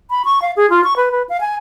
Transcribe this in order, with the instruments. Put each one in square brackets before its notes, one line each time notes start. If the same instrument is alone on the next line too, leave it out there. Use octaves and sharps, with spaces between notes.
[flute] B5
C#6
F5
G#4
F4
C#6
B4
B4
F5
G#5